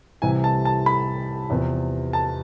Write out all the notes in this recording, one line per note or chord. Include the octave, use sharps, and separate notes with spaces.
C2 C3 E3 G#5
A5
A5
B5
E2 C3 F3 B3
A5